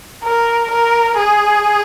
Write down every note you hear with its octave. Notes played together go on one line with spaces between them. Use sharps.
A#4
A#4
G#4